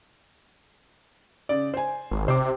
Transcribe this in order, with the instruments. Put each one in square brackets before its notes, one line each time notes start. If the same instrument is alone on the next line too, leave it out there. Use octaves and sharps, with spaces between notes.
[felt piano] C#3 D5
C5 G#5
[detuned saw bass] G#1
[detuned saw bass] C3 [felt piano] C5 D6